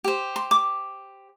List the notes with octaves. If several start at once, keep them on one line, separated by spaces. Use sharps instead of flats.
G4 C5
C6
D6